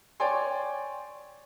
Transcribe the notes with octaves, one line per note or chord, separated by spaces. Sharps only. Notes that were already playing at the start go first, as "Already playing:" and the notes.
C#5 D5 G5 G#5 C6